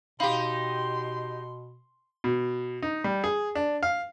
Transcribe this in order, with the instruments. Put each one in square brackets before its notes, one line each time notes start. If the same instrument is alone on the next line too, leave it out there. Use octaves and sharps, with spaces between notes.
[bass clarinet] B2 [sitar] D#4 G4 [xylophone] F5 B5 [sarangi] C6
[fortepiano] B2
D#4
G3
G#4
D4
F5